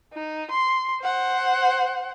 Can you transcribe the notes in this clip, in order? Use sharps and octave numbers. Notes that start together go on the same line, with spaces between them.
D#4
C6
C5 F#5